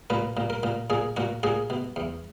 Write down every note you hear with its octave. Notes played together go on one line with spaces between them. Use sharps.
A#2 B4
A#2
A#4
A#2
A#2 G#4
A#2 F#4
A#2 G#4
B2
E2